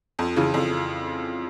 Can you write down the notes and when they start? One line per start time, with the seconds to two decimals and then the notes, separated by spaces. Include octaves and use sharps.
0.19 F2
0.36 C#3 E3
0.54 F2